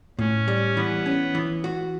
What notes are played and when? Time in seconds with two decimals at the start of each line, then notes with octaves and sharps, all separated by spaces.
0.19 A2 C#4
0.48 G3
0.77 E3 B3
1.06 C#4
1.35 E3
1.64 F#4